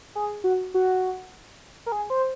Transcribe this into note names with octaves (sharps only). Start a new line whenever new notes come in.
G#4
F#4
F#4
A#4
G#4
C5